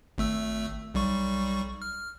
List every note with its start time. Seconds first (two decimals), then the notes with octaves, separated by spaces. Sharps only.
0.18 G#1 A3 E6
0.94 B1 G3 C#6
1.82 F6